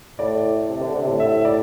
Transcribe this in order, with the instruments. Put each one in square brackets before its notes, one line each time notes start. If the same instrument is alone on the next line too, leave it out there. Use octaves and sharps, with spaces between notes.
[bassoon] A2 [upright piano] D5
[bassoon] C3
D3
C3
A2
[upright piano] E5
D5